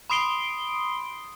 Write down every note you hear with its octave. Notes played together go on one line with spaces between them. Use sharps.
B5 C6 D#6 C7 D7 G7